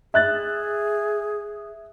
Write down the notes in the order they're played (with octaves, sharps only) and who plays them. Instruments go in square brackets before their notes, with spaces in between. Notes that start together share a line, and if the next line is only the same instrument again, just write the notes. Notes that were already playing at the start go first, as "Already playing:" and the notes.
[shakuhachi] G#4 [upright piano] E5 F#6 A6